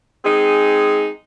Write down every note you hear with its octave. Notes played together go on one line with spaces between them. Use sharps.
G#3 C4 D#4 G#4